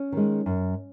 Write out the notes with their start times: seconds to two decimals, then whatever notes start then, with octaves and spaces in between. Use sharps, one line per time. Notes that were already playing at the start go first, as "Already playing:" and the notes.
Already playing: C#4
0.12 D#3 G#3
0.46 F#2